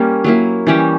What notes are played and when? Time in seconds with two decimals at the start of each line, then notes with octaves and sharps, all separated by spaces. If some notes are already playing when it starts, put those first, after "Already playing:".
Already playing: G3 A#3 C#4
0.24 F#3 A#3 E4
0.67 E3 G3 C#4 G4